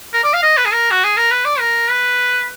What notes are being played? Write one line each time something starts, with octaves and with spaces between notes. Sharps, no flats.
A#4
D5
F5
D#5
B4
G#4
A#4
F#4
G#4
A#4
B4
D5
A#4
B4